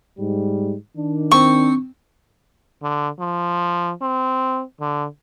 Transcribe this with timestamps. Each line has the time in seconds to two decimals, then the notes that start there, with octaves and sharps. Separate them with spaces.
0.19 G#2 G3
0.96 D#3 D4
1.32 C4 C#6
2.83 D3
3.20 F3
4.02 C4
4.80 D3